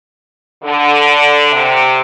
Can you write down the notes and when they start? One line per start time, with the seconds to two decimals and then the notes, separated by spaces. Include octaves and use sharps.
0.63 D3
1.52 C3